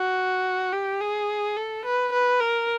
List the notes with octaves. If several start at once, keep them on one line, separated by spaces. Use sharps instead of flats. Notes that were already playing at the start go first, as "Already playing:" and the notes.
Already playing: F#4
G4
G#4
A4
B4
B4
A#4